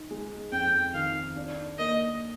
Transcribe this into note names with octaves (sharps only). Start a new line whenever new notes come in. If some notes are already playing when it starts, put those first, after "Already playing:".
Already playing: D#4
G#3
F2 G5
D#3 F5
D4
A#3 D#5